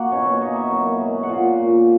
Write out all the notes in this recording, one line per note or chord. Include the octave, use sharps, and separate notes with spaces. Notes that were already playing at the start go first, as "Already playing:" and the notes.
Already playing: A#3 F#4 F#5
B2 C#4 C#5
C#4 C#5
A#3 D#4 D#5
E4 E5
F#2
G#3
F#5
A#2 F4 F5
A#2